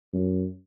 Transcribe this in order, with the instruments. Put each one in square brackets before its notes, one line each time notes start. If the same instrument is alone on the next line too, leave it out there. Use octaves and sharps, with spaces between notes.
[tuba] F#2